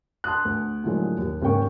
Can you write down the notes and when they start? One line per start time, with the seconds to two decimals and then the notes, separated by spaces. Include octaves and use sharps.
0.24 A5 C6 D#6 F#6
0.45 D2
0.84 A2 D3 F3 F#3 G#3 A#3
1.18 D#2
1.42 G#1 C#3 A#3 C#4 G5 C#6